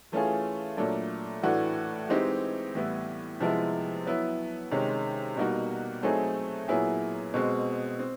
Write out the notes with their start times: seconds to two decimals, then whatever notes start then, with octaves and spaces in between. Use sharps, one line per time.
0.12 E3 A3 C#4 F4 G#4
0.77 A#2 F#3 A3 D4
1.43 A2 E3 A3 D4 F#4
2.09 E3 G#3 C4 D#4 G4
2.75 A2 E3 G3 B3 E4
3.40 C3 F3 G#3 B3 E4
4.06 F#3 B3 E4
4.71 C3 D#3 G#3 C#4
5.37 B2 G3 A#3 D#4 F#4
6.03 F#3 A3 C4 D#4 G#4
6.68 A#2 F#3 B3 E4 G#4
7.34 B2 G#3 C4
7.99 C4